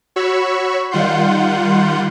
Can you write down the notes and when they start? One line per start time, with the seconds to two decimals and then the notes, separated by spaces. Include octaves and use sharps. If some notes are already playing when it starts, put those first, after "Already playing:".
0.16 F#4 C#5 B5 C#6 E6
0.91 D#3 G3 F4 F#5 C6 G6